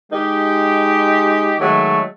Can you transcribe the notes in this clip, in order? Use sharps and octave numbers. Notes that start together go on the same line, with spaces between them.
G#3 D#4 G4
D#3 F#3 G#3 A3